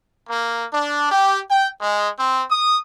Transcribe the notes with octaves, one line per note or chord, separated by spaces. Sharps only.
A#3
D4
G4
G5
G#3
C4
D#6